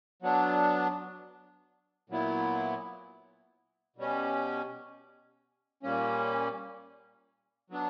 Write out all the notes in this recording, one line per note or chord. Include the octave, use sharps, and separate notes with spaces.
F#3 B3 D4
A#2 F#3 B3 E4
B2 G3 C#4
A#2 G3 A#3 C#4
F#3 B3 D4